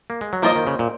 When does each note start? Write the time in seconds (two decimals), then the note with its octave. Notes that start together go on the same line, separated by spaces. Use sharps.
0.10 A#3
0.21 G#3
0.33 F#3
0.42 F3 A#3 F4 C5 D#5
0.56 D#3
0.67 C#3
0.79 A#2